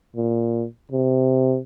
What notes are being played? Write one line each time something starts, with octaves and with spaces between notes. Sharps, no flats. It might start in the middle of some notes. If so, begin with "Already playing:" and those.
A#2
C3